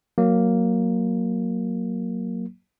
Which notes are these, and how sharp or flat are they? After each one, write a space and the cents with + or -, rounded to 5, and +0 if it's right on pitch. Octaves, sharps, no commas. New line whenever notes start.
F#3 +0 A#3 +0